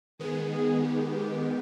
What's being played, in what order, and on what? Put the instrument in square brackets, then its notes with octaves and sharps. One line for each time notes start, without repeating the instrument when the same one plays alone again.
[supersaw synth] D#3 G#3 B3 [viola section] G#4
[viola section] G#4
G4
G4